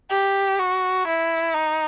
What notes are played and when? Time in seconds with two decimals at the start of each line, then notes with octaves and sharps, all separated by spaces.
0.11 G4
0.59 F#4
1.07 E4
1.54 D#4